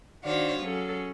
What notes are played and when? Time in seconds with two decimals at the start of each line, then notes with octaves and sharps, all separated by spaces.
0.24 D#3 D4 F#4 C5 C#5 F5
0.59 F#3 C#4 G#4 A4